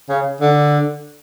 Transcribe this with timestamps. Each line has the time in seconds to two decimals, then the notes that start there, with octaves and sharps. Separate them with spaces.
0.09 C#3
0.41 D3